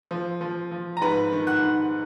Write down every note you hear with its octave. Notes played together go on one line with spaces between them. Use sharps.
F3
F3
F3
A#5
G#2 B4 B5
D#3
F#5 F#6
D#3